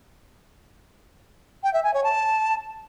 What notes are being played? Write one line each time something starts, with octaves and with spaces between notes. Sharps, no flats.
G5
E5
G#5
C#5
A5